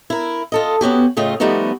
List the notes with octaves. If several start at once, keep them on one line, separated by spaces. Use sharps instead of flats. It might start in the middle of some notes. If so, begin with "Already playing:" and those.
E4 A#4
F4 A4 D#5
B3 C#4 F#4 G4
A2 C#3 A3 F4 D#5 G5
F3 G3 A3 B3 D#4 F#4